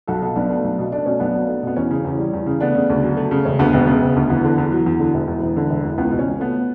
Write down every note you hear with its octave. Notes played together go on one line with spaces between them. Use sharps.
B1 F#4 A4
B2 F#4 A4
B1 B3 D4
A3
B1
B2
A3 D4
B2 C#4
B1 B3 D4
F#3
A3
B2 B3
E2 C#4
C#3
E2
G3
E2
C#3
A3 B3 D4
C#3
D2
F#3
A3
C#3
E1 C#4
D2 B3
E1 B3
C#3
E1
D2
E2 B3
D3
E2
F#3
E2
D3
E1
E2
E1
D3
E1
E2
C#2 B3
B2
C#4
C#2
A3 B3